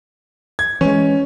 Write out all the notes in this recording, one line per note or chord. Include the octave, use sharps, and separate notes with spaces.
G#6
E3 G#3 C#4